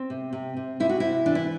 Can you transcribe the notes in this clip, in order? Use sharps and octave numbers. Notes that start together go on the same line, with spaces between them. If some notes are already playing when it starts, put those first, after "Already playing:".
Already playing: C4
C3
C3
C3
C3 E4
F#4
C3 E4
E3 D4
E4